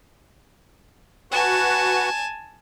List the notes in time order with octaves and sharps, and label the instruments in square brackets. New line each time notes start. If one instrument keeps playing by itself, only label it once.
[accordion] F#4 B4 F#5 [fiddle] G#5 A5